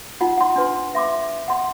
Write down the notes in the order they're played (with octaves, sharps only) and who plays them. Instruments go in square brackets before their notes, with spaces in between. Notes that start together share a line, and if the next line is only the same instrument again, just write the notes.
[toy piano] D#4 F4 F#5
F#5 C6
D4 B4 C6
E5 C6 D6
F#5 C6